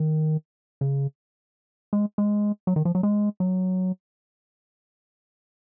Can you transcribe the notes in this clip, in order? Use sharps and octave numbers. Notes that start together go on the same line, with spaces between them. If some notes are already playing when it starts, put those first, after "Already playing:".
Already playing: D#3
C#3
G#3
G#3
F#3
D#3
F3
F#3
G#3
F#3